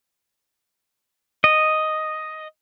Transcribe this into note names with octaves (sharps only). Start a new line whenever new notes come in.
D#5